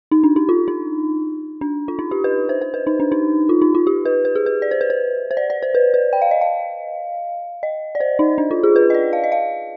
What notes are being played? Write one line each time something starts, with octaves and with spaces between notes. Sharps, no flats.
D#4
D4
D#4
F4
D#4
D4
F4
D#4
G4
B4
C5
C5
B4
D#4
D4
D#4
F4
D#4
F4
G4
B4
B4
G#4
B4
D5
C5
B4
C5
C5
D5
D5
C5
B4
B4
G5
F5
D#5
F5
D#5
D5
C5
D#4
D4
F4
G#4
B4
D#5
D5
F5
D#5
F5